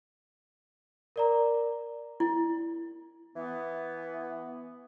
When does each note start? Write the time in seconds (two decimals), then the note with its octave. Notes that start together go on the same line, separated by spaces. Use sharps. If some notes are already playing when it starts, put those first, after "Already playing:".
1.16 A#4 D5 A#5
2.20 E4
3.36 E3 B3